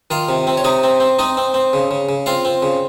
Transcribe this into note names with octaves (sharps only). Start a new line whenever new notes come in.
D#3 F4 F5
C3
C4
C#5
C3 D#4 D#5
C4
C4
C4 D#4 D#5
C4
C4
C#3
C#3
C#3
C4 F4 F5
C4
C#3